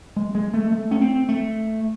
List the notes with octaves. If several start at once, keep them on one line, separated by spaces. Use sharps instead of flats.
G#3
G#3
A3
A3
C#4
C4
A3